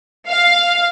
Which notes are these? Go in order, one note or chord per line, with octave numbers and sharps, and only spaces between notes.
F5